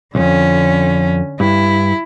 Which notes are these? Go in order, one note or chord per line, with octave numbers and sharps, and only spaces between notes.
B1 F2 D3 C#4
G2 E4